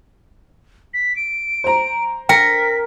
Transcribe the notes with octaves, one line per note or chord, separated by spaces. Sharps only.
B6
D7
C5 A#5
A#4 G5 B6